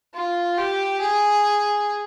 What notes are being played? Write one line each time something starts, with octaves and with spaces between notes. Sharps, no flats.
F4
G4
G#4